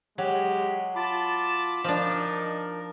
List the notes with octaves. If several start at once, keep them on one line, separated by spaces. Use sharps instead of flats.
F#3 G#3 G4
F4 A5 B5 D6
F3 D4 D#4 A#4